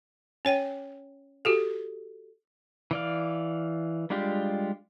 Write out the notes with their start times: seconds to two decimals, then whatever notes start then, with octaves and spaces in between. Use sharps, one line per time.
0.45 C#4 C#5 G5
1.45 F#4 G4 A4
2.91 E3 D5 F5
4.10 G3 G#3 D4 F4 G4